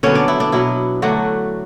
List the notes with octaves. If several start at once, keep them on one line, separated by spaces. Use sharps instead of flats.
D3 F#3 B3 C#4 C#5
D4 D5
E4
D4
B2 F#3 B3 E4
D3 F#3 A3 D4 F#4